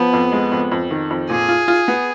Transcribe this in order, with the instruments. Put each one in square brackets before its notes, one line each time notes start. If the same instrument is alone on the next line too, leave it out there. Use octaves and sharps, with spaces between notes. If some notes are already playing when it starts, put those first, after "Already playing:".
Already playing: [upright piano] F3 [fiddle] B3
[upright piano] F2
G#3
F2
F2
D#3
F2
[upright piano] A#2 [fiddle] G#4
[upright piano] F4
F4
B3